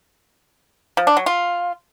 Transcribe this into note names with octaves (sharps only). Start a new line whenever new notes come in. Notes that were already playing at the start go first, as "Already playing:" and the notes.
F3
D4
F#3
F4